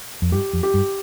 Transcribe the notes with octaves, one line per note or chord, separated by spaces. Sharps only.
F2
G2 G4
F2
G4
G2